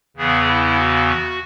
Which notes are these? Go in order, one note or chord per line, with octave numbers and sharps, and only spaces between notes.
E2 C#3 E3 B3 G#4
E4
F#4